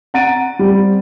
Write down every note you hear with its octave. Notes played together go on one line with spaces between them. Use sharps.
F#5 A#5 A6 D7 D#7
G3 C4